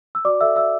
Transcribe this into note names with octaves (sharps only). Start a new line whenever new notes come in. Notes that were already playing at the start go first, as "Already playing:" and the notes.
E6
F#4 D5 D6
A4 E5 E6
F#4 E5 E6